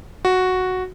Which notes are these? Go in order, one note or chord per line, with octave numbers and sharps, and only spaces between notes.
F#4